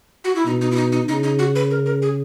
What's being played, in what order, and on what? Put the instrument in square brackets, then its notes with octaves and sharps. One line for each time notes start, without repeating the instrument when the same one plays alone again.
[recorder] F#4
E4
[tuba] B2 [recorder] D#4
[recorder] D#4
E4
D#4
D#4
[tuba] C#3 [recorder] D#4
[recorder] D#4
F#4
B4
A#4
A#4
G#4